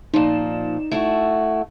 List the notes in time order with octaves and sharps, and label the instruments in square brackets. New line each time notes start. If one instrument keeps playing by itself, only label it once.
[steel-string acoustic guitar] A#2 F3 [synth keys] D#4 D5 E7
[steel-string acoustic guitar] A3 E4 F#4